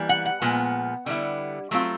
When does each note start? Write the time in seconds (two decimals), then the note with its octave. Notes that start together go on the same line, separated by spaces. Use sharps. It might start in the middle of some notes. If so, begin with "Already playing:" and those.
Already playing: E3 G3 A#3
0.09 F#5
0.25 F#5
0.42 A#2 F3 G#3 B3
1.06 D3 G3 B3 E4
1.71 F#3 A3 C4 F4